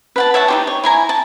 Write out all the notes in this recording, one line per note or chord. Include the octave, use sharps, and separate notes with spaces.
B4 F#5 A5
C#5 E5 F#5 A5
D#4 F4 G4
C#5
E4 G#5 A#5
A5